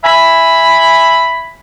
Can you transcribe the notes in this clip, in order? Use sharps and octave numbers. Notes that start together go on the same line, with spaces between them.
E5 G#5 B5